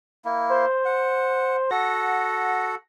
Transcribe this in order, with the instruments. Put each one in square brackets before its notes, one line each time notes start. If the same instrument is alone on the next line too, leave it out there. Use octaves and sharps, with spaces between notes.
[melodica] A#3 E4
[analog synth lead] C5
[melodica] F#5
[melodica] F#4 A4 F#5 [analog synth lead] A#6